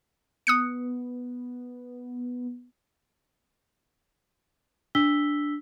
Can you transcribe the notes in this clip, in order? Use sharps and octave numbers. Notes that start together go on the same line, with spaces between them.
B3 D#6 F#6 C#7
D4 E6 B6 G7